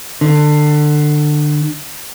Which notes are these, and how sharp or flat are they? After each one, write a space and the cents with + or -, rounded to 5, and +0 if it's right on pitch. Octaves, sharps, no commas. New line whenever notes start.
D3 +25